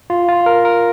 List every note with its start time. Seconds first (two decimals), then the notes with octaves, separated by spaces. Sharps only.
0.10 F4
0.28 F4
0.46 A#4
0.65 A#4